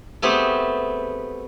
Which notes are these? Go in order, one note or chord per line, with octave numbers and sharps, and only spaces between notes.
A3 B3 C4 G4 G#4